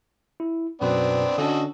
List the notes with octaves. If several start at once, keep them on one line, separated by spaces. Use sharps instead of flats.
E4
F#2 B2 B3 C4 D4 B4
D3 C#4 D4 F#4 A4 D#5